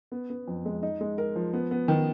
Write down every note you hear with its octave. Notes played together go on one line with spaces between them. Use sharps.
B3
B3
F2
G#3
D#4
G#3
A#4
F3
B3
B3
D#3